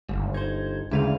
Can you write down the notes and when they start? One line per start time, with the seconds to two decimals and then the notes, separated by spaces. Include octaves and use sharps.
0.09 G1 D#2 G#2
0.34 D#4 C5 G#6
0.91 D2 C#3 G#3 C#4 E4 B4 F5